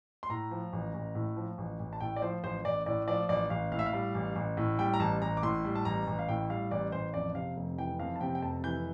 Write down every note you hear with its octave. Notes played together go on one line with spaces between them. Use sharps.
C6
A2 A#5
F3
A1
A1
A2
F3
A1
A1
A5
A2 G5
D5
F3 C5
A1 C5
A1 D5
A2 D5
F3 D5
A1 D5
A1 F5
A2 F5
E5
F5
G3
A1
A1
A2
G3 G5
A#5
A1 A5
A1 A#5
D6
A2 C6
G3
A5
A1 A#5
A1
F5
A2 G5
G3 F5
A1 D5
A1 C5
F2 D5
C3 F5
F1
E3 G5
F2 F5
A5
C3 G5
G5
F1 A5
E3 G6